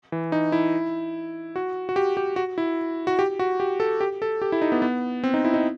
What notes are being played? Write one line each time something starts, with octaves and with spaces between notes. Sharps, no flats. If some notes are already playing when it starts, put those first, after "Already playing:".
E3
D#4
E4
F#4
F#4
G4
G4
F#4
E4
F#4
G4
F#4
G4
A4
G4
A4
G4
E4
D#4
B3
B3
C4
D#4
E4
D#4